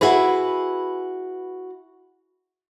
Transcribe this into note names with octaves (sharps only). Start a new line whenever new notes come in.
E4 F#4 G#4 B4